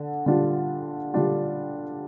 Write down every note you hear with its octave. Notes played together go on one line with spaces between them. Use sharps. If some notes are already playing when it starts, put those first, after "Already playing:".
Already playing: D3
D3 G3 D4 F4
D3 G3 D4 F4